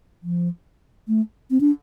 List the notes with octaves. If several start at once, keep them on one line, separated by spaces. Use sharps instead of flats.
F3
A3
C4
D4